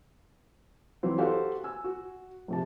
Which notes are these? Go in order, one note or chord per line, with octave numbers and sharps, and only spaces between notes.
E3 F#3 C4
F#4 G4 A4 C5 F5 F#5
G#5 E6
F#4
A#1 C3 A5